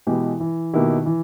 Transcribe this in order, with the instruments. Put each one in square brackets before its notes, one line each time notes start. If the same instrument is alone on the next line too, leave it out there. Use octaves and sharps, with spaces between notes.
[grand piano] B2 G#3 B3 G4 [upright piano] E3
[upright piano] E3
[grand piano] B2 A#3 E4 G4 [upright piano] D#3
[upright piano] E3